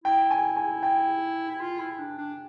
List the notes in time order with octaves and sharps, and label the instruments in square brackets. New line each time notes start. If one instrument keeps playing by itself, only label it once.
[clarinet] E4 [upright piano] G5
[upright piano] G#5
G#5
G5
[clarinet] E4
F4
E4
D4
D4